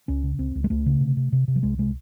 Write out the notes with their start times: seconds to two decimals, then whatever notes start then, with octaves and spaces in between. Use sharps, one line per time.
0.08 C#2 C#4
0.23 C#3
0.39 C#2 C4
0.55 C#2
0.64 G#3
0.70 C#2 A3
0.86 C#3
1.01 C3
1.17 C3
1.32 C3
1.48 C3
1.56 F#3
1.63 C2 G#3
1.78 C3 G#3